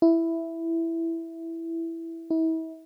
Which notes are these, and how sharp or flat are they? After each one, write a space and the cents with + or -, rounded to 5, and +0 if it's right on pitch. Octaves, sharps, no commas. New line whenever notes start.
E4 +5
E4 -35